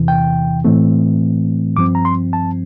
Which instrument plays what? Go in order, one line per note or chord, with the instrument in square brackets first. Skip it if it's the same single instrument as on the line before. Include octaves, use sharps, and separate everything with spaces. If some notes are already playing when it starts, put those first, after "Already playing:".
Already playing: [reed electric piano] E2 C3 E3
G5
A2 E3 A3 C4
G2 F3 C4 D6
A#5
C6
A5